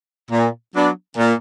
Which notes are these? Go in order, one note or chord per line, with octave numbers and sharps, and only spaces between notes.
A#2
F#3 B3 D4
A#2